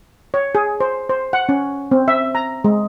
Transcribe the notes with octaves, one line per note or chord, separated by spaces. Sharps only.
C#5
G#4
C5
C5
F#5
C#4
C4
E5
A#5
G#3